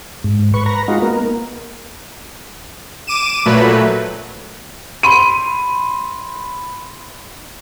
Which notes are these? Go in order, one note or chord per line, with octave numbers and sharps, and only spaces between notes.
G#2
B4 C#6
B4 A#5
G#3 D#4 F4 F#4
A#3 B3 A#4
D6 D#7 E7
A#2 F#3 A3 B4
B5 C6 D#7